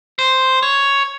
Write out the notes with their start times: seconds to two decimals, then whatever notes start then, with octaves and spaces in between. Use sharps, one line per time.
0.19 C5
0.63 C#5